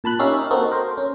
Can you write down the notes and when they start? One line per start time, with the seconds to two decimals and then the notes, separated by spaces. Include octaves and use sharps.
0.04 A#2 A5 B5 F#6
0.19 C#4 D#4 G4 A#4 E5 F5
0.39 D#4
0.51 A#3 C4 D#4 F#4 A4
0.72 A#4 C5
0.98 C#4